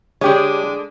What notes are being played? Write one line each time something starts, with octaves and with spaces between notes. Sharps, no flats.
D3 G#3 D4 G4 C#5